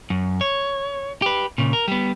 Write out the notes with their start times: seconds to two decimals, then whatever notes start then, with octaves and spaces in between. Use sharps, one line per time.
0.10 F#2
0.41 C#5
1.22 G4 B4
1.58 A#2 C#3
1.73 A#4
1.88 G3 B3